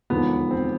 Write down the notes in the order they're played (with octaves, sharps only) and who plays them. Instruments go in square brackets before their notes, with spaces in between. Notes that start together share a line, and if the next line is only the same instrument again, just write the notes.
[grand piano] E1 D#2 D3 F3 B3
C4